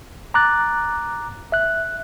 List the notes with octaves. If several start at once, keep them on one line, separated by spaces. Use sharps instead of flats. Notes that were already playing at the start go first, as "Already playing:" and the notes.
A#5 D6 F#6 A6
E5 F#6